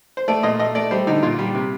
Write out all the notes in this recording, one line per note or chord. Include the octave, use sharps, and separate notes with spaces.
C5
A3 D5
A#2 D#5
A3 D#5
A3 D5
G3 C5
D3 D#4
A#2 F4
G3
C3